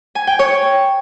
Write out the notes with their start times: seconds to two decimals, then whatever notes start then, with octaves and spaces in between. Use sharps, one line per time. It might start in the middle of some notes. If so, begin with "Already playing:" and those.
0.15 G#5
0.27 G5
0.39 C#5